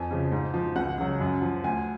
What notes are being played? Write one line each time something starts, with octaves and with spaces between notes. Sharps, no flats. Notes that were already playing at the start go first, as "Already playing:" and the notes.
Already playing: F2 G#5
C#3 F3
G#2
F3
C#2 F#5
C#3 F#3
F#2
F3
D2 G#5